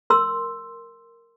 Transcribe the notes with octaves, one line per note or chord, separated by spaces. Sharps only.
A#4 C6 E6